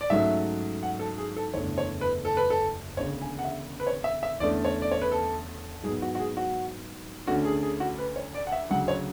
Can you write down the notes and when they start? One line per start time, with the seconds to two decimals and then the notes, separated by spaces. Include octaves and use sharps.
0.01 D5
0.10 G#2 F#3 A3 C#4 E5
0.83 F#5
0.99 A4
1.18 G#4
1.36 A4
1.54 F#1 E2 D3 A3 C#5
1.78 C#5
2.01 B4
2.25 A4
2.37 B4
2.50 A4
2.97 E1 D2 C#3 C#5
3.22 G#5
3.39 F#5
3.44 E5
3.80 B4
3.87 C#5
4.04 E5
4.23 E5
4.40 E2 D3 A3 C#4 D5
4.65 C#5
4.82 D5
4.91 C#5
5.02 B4
5.12 A4
5.83 G#2 F#3 B3 G#4
6.02 F#4
6.15 F#4
6.19 G#4
6.37 F#4
7.27 D2 D3 A3 C#4 F#4
7.45 G#4
7.63 G#4
7.80 F#4
7.98 B4
8.16 C#5
8.35 D5
8.47 F#5
8.52 E5
8.70 D2 C#3 F#3 F#5
8.88 C#5